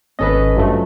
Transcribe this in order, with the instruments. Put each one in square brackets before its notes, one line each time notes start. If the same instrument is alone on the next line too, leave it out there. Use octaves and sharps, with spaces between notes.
[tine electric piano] G#1 D#5 [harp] C#4 A4 B4
[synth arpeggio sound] G2 F3 A3 [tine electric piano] F#3